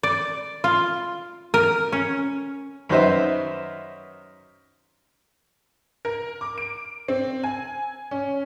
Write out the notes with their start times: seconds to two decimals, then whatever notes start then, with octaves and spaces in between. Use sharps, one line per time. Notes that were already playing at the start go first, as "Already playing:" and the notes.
0.03 D5
0.64 F4
1.54 A#4
1.92 C#4
2.89 F#2 D#3 B4 C5 D#5 E5
6.05 A#4
6.41 D6
6.58 D7
7.08 C4
7.44 G#5
8.11 C#4